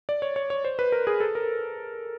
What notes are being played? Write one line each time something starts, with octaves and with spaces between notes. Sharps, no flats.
D5
C#5
C#5
C#5
C5
B4
A#4
G#4
A4
A#4